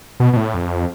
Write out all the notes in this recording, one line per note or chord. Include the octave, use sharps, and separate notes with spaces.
B2
B2
A2
F2